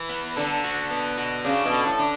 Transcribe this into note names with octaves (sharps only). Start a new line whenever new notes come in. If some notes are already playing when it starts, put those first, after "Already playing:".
Already playing: E3
B3
D3 A4
F#4
B3
F#4
C#3 D4
B2
A4
A2
D4